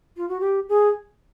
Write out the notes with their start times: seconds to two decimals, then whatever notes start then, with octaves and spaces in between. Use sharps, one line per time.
0.17 F4
0.29 F#4
0.40 G4
0.69 G#4